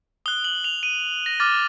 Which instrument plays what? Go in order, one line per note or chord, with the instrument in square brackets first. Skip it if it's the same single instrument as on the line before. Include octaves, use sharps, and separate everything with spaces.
[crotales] D#6 F#6 G7
F#7
F7
D#7
A#6
D6 F6 A6